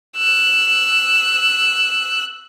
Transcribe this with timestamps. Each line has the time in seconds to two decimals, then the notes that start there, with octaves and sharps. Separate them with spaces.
0.17 E6 F#6